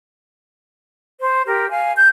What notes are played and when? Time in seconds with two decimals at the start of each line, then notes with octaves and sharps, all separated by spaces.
1.21 C5
1.47 G4 A#4
1.70 F5 G#5
1.97 G6